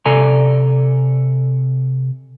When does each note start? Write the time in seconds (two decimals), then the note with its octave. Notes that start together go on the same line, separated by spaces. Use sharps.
0.05 C3 A4 D5 G#5 A#5